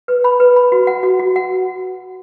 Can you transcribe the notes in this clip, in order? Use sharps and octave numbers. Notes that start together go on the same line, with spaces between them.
B4
B5
B4
B5
F#4
F#5
F#4
F#4
F#5